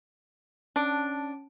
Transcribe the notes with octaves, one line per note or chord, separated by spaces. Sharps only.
C#4 D4 A5 D7